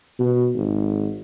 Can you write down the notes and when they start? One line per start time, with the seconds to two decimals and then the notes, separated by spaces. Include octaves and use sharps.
0.19 B2
0.54 G#1